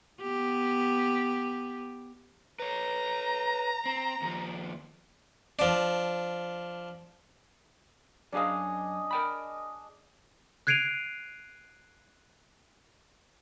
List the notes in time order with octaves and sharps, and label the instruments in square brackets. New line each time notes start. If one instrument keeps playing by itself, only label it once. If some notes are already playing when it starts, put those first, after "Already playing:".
[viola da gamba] B3 G4
[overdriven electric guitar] B4 C#5 [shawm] A#5
[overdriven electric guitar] C4
D#2 F3
[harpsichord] F3 D4
[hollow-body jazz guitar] F#2 C#4 F5 [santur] D4 G#4 D#5
[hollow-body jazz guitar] A#4 G5 B5
[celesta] F#6 G#6 C7 D7 D#7 F7